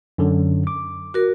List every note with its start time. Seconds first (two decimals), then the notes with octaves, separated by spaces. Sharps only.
0.18 F#2 D3 F#3
0.67 D6
1.14 F#4 A#4